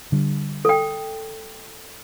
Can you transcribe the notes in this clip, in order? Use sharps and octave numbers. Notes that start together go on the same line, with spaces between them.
D3 G3
A4 G5